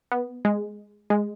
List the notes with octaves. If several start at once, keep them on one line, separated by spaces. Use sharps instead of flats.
B3
G#3
G#3